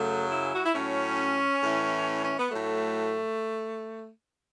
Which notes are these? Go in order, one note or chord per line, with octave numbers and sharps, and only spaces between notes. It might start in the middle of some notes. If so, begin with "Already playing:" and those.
Already playing: F#2 C#3 F#3 A3
E4
F#4
E4
A2 F#3 C#4
A2 E3
C#4
B3
A2 F#3 A3